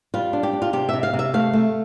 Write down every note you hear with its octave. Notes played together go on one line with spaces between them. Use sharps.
G3 F4
D4
G4
D4
F4
C3 G4
C3 E5
F5
C3
E5
A3 F5
A3